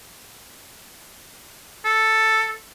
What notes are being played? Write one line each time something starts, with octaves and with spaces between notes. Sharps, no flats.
A4